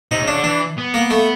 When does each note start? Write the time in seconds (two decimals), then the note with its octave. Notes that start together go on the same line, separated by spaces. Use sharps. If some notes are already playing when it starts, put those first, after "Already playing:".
0.11 C3 D#4
0.22 C#3
0.28 D4
0.34 D3
0.44 E3 D4
0.78 B3
0.94 A#3
1.10 A3